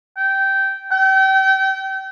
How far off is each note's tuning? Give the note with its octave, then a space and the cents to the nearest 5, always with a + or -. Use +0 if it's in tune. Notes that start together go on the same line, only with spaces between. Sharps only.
G5 -15
G5 -35